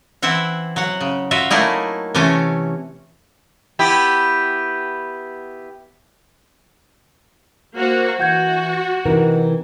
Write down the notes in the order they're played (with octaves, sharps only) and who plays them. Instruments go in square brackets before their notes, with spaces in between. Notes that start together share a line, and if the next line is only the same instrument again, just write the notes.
[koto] E3 C4 E4 E5 F#5
F#3 F#5
C#3
F4 F#4 E5
F#3 A3 A#3 D#4 E4 G#4
C3 E3 A3 C#4
[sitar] B3 E4 G4
[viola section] A#3 F#4 [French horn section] C5
[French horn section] E3 [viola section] F#4 [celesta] F#5 G6 G#6
[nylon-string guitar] C3 E3 A#4 [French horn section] D#4